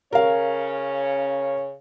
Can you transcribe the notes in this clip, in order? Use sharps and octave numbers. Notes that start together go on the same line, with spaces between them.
C#3 C#4 A#4 C#5 F5